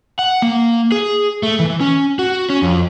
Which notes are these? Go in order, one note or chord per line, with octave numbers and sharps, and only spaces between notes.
F#5
A#3
G#4
A3
E3
C#4
F#4
C#4
F2